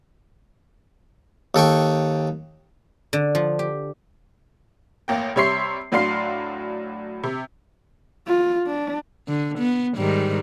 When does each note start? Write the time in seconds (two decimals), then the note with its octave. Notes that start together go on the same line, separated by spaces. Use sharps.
1.55 D#2 A4 G5 C#6
3.13 D3
3.35 F3
3.59 G4
5.08 A1 A#3 G5
5.36 C3 G3 C#5 E5 C6 C7
5.92 A2 F#3 D4 F5 C6 C7
7.24 C3
8.27 F4
8.66 D4
9.28 D3
9.59 B3
9.97 G#2 D#3 G3